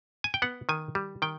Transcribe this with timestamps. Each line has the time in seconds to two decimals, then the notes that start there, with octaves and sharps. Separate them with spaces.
0.24 G#5
0.34 G5
0.42 B3 F#5
0.69 D#3 G#5
0.95 G3
1.22 D#3 G5